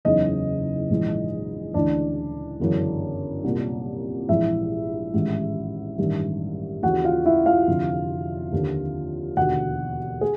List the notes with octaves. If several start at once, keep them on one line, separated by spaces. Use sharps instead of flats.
F#1 E2 C#3 E3 D#4 D#5
A#1 G#2 E3
D2 C#3 E3 D4 D5
G1 F#2 C#3 E3
C2 A#2
A#1 G#2 E3 E4 E5
A1 G#2 D#3
A1 G2 D#3
D#2 C#3 E3 F#4 F#5
F4 F5
E4 E5
F4 F5
F1 F2 D3
D#2 D3
E1 D#2 D3 F#4 F#5
G#4